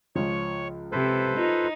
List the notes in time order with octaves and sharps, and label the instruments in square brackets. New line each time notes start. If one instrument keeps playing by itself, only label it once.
[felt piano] C#2 F3 [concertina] C#5 C#6
[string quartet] C3 [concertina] A4 B4 C5
[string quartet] D#4 [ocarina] F4